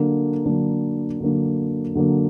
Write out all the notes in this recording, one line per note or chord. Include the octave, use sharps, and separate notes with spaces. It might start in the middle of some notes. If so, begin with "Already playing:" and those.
Already playing: D3 F#3 A#3 D4
D3 F#3 A#3 D4
D3 F#3 A#3 D4
D3 F#3 A#3 D4